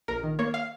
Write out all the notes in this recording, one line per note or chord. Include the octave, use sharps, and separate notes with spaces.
A#1 A#4
D#3
A#3 C#5
F5